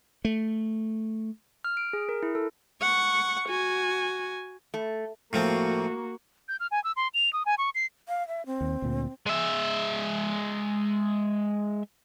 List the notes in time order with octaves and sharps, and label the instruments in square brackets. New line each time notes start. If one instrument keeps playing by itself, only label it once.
[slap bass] A3
[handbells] F6
D7
G#4
A#4
E4
A4
[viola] F#5 C#6
F#4 G#5
[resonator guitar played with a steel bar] A3
[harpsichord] A2 F3 C4 [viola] A#3 F#4
[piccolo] G6
F6
G#5
E6
C6
F7
D#6
G#5
C#6
C7
[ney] F5
E5
C4
[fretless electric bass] D#2
D2 A#2
[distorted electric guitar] G#3 E5